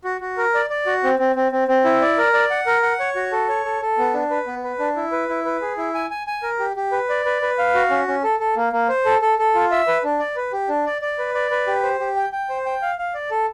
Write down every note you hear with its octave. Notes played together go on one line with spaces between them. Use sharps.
F#4
F#4
A#4
D5
D5
F#4
C4
C4
C4
C4
C4
E4
D5
A#4
D5
F#5
A#4
F#5
C#5
F#4
A4
C#5
A4
A4
B3
D4
B4
B3
B4
D4
E4
B4
E4
B4
G#4
E4
G#5
G#5
G#5
A#4
G4
G4
B4
D5
B4
B4
F5
F#4
C#4
C#4
A4
A4
A#3
A#3
C5
A4
A4
A4
F4
E5
B4
D4
D5
B4
G4
D4
D5
D5
B4
D5
B4
G4
C5
G4
G5
G5
C5
G5
F5
F5
D5
A4